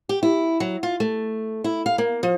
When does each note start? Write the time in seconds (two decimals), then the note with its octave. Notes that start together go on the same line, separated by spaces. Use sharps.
0.09 G4
0.23 E4
0.60 F#3
0.83 F4
1.00 A3
1.64 E4
1.86 F5
1.98 A#3
2.23 F3